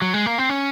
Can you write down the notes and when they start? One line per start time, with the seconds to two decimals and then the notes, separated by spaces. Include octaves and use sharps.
0.02 F#3
0.14 G#3
0.26 A#3
0.38 C4
0.49 C#4